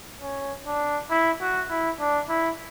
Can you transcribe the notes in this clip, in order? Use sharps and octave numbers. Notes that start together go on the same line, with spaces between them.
C#4
D4
E4
F#4
E4
D4
E4